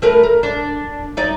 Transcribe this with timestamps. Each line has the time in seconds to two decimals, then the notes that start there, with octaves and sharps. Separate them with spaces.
0.02 A3 A#4 B4
0.23 A#4
0.43 D4
1.17 D#4 D5